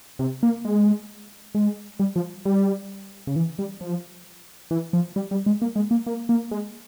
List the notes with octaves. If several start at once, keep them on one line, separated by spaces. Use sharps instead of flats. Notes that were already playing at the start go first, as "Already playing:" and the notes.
C3
A#3
G#3
G#3
G3
F3
G3
C#3
E3
G3
F3
E3
F3
G3
G3
G#3
A#3
G#3
A#3
A#3
A#3
G#3